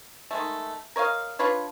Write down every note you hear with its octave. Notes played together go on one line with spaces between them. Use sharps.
D#3 G#3 A3
A#4 C#5 D#5 F5
D4 F4 B4 C#5